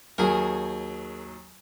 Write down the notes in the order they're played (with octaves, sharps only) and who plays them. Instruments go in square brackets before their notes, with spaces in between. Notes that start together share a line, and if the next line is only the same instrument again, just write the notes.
[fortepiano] D#2 F#3 G#5 [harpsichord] G#4 A#4